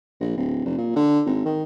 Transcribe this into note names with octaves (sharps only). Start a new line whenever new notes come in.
A#1
D1
F1
A#2
D3
G#1
D#3